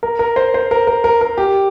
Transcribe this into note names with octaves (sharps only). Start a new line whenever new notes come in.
A#4
A#4
C5
C5
A#4
A#4
A#4
A#4
G4